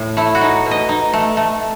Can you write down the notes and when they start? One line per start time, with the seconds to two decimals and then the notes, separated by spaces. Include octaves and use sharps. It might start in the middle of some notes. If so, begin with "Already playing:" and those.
Already playing: A2
0.17 A3 E4
0.35 F#4
0.41 D#4
0.66 B2
0.71 D#5
0.89 D#4
1.13 A3
1.37 A3